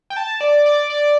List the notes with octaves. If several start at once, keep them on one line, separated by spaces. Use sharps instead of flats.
G5
A5
D5
D5
D5